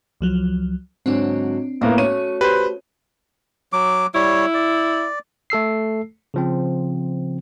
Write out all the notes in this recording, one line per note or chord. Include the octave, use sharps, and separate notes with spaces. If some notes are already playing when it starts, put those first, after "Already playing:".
C#2 F3 F#3
G#2 D3 F#3 C4 D4
A2 A#3 B3 F4 A4 A#4
A3 C#4 F#4 C#5 C#6 D#7
G4 B4 C5
F#3 D6
G3 E4 C#5
D5
A3 A4 E6 C7
C#3 F3 C4